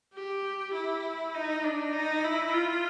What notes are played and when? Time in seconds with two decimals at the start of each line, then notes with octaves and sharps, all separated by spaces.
0.14 G4
0.74 E4
1.34 D#4
1.64 D4
1.93 D#4
2.24 E4
2.54 F4